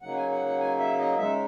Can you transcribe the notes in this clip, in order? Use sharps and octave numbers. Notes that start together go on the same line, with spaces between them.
C#3 F#3 A#3 D#4 F#5
G#5
F#5
F#5
G#5
E5
D#5
C#3 G#3 D#4 E5